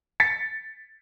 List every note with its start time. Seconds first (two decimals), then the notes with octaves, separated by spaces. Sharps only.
0.20 A6 B6 C#7